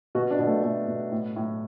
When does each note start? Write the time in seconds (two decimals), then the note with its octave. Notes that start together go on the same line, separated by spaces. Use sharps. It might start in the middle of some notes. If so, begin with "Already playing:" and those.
0.15 B2 F#4
0.31 D4
0.39 B2
0.47 A3
0.63 B2 A3
0.87 B2
1.12 A2
1.36 A2